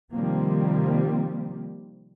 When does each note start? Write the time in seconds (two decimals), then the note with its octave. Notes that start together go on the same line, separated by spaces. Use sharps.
0.13 C3 D#3 F3 G3 A#3 C4